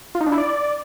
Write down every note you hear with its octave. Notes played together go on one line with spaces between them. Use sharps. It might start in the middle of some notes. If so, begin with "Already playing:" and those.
F4
D#4
D4
E4
D5